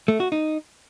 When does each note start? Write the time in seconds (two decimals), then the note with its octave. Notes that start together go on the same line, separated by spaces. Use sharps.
0.08 A3
0.20 F#4
0.32 D#4